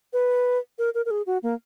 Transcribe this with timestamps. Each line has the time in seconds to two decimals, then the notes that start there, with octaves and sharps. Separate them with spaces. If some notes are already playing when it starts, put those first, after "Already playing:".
0.13 B4
0.78 A#4
0.95 A#4
1.06 A#4
1.11 G#4
1.27 F#4
1.43 A#3